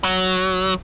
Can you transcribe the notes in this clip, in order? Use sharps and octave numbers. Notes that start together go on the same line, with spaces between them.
F#3